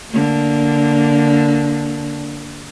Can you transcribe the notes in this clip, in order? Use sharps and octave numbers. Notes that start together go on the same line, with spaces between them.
D3 A#3